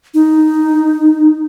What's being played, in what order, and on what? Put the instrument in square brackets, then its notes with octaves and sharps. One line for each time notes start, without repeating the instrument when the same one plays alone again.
[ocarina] D#4